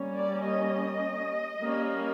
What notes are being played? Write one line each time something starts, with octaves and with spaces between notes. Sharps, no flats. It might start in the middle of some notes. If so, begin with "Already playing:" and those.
Already playing: G3 A#3 C#4
D5
D#5
G3 A#3 C#4